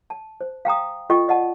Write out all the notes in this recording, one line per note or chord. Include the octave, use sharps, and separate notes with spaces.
A5
C5
F5 G5 A#5 D#6
F4 A4 D#5 G5 C#6
D5 D#5 F#5 A5